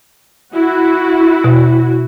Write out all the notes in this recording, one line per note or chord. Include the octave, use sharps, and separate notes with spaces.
E4 F#4
B2